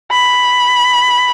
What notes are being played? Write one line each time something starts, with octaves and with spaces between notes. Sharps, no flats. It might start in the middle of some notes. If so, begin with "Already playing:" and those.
B5